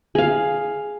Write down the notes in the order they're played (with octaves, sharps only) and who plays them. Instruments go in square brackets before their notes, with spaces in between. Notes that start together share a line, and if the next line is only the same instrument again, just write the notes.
[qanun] G#4 F5